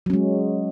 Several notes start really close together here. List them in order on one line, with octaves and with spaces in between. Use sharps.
F#3 C#4 G#3